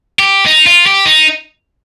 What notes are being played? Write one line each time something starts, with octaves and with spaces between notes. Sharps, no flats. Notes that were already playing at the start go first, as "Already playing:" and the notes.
G4
D#4
F4
G4
D#4